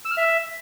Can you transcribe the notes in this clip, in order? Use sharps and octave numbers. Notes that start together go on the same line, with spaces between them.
E6
F6
E5